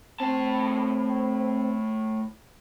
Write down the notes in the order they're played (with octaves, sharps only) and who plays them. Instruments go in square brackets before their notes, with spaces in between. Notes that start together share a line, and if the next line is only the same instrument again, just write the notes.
[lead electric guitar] A2 A5 [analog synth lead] C4